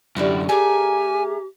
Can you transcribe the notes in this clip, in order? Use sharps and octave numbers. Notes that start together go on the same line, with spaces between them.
F#2 D3 G3 E4 F#4
A3 G4 G#4 A#4 G#5